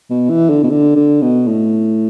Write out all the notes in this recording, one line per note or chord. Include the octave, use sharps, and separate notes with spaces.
B2
E3
D3
B2
D3
D3
B2
A2